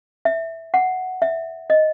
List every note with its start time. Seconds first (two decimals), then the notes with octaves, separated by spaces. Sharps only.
0.25 E5
0.74 F#5
1.22 E5
1.70 D#5